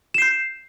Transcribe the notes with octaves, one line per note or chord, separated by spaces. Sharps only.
G6 C7 E7